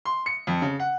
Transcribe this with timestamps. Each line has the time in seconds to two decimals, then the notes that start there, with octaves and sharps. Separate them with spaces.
0.05 C6
0.26 C#7
0.47 F2
0.62 C#3
0.79 F#5